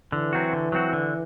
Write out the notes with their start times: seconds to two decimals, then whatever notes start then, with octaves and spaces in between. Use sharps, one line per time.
0.12 D3 E3
0.33 F#3 C4 F#4
0.53 D3
0.72 F#3 C4 F#4
0.93 D3